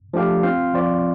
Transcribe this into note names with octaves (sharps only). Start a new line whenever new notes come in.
F3 A3 D4 G4 F5
C4 F4 C5 F5
F3 C4 F4 D5